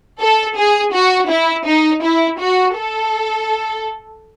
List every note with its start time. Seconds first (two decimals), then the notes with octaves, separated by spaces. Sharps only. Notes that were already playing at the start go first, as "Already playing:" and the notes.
0.20 A4
0.57 G#4
0.94 F#4
1.30 E4
1.67 D#4
2.03 E4
2.40 F#4
2.77 A4